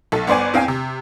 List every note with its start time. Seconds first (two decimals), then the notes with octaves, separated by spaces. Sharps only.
0.12 B1 A4
0.27 G1 B3 C5 D5 G#5
0.54 E2 C4 F5 G5 G#5
0.68 C3